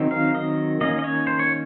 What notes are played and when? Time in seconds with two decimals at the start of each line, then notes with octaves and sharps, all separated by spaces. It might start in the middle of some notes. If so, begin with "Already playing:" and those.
Already playing: D#3 F#3 C4 D#4
0.11 F5
0.35 D#5
0.81 D#3 A#3 C#4 D#5
0.99 D#5
1.04 C#5
1.27 C5
1.39 C#5